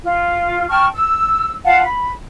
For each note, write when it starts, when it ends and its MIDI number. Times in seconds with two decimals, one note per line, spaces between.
0.03 0.67 65
0.70 0.87 79
0.70 0.87 81
0.70 0.87 85
0.70 0.87 89
0.93 1.53 88
1.64 1.82 65
1.64 1.82 77
1.64 1.82 78
1.64 1.82 81
1.82 2.11 83